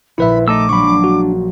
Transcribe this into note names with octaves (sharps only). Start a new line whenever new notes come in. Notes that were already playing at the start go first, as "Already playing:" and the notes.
A#1 A#2 E4 B4 E5 B5
A3 D#4 A5 D6 E6
F#3 G#3 A#3 D4 B5 C#6
F#4